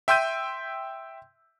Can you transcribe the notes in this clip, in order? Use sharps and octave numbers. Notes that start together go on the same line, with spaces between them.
E5 G5 C6 E6 G6 D#7